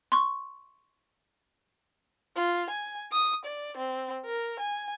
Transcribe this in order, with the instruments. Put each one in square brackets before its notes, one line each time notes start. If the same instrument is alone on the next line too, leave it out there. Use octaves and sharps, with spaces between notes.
[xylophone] C6 C#6
[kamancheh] F4
G#5
D#6
D5
C4
A#4
G#5